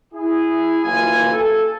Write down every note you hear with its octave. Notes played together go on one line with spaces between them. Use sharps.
E4 G#4
F#1 D#2 E3 F4 G#5
A4